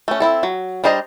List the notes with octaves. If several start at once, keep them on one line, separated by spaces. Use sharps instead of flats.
A3 C#4
C4 E4 A4
F#3
G3 D4 C5 D#5 A#5